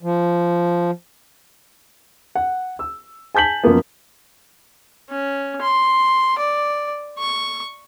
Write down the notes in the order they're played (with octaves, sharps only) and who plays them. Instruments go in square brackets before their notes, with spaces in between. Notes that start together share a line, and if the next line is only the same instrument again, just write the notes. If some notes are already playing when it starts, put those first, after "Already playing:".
[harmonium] F3
[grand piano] F#5
E6
G#5 A5 G6 B6 F#7
F#2 F3 A#3 B3
[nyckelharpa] C#4
C6
D5
C#6